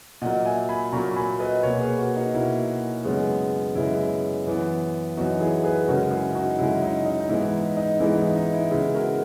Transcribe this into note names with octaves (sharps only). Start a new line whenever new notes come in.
A#2 F#3 A#3 D#5 F#5
E5 G#5
G#5 B5
A#2 F#3 A#3 A#5 C#6
C#6
G#5 B5
B4 D#5
B2 A#3 A#4 C#5
G#4 B4
F#4 A#4
D#4 F#4
B2 A#3 E4
F#2 C#3 G#3 B3
F#2 C#3 G#3 B3 E4
F#2 E3 B3
F#2 E3 B3 D#4 F#4
E4 G#4
G#4 B4
F#2 C#3 G#3 F#4 A#4
E4 G#4
D#4 F#4
F#2 C#3 G#3 E4
D#4
D#4
D#4
G#2 E3 G#3 B3 E4
E4
D#4
D#4
G#2 E3 G#3 B3 E4
D#4
E4
D#4
E4
C#3 G#3 B3 E4 G#4
F#4 A#4